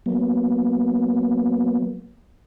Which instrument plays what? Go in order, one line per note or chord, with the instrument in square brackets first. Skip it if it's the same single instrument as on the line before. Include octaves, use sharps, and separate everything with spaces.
[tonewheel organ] F#3 A#3 B3